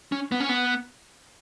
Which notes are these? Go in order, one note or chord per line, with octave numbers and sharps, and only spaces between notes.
C#4
B3
C#4
B3